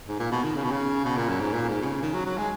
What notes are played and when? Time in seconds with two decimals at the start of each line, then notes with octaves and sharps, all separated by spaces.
0.08 G#2
0.20 A#2
0.32 B2
0.44 D#3
0.56 C#3
0.64 B2
0.71 C#3
1.04 B2
1.17 A#2
1.29 F#2
1.41 G#2
1.53 A#2
1.69 G#2
1.81 B2
1.85 C#3
2.02 D#3
2.14 F#3
2.26 F#3
2.38 G#3